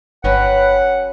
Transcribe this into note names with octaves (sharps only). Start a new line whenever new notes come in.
G1 F#3 C#4 B4 F#5 G5 B5